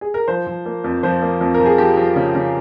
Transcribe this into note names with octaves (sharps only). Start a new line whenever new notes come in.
G#4
A#4
F3 C5
F3
A#3
F2
F3 C5
A#3
F2
A#4
F3
G#4
F3 G4
F3
C#3
C#3